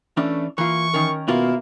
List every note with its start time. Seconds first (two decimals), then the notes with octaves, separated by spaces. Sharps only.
0.17 E3 A3 C#4 D4
0.58 E3 A#3 F4 C#6
0.93 D#3 C#4 A#4
1.28 B2 A#3 E4 F4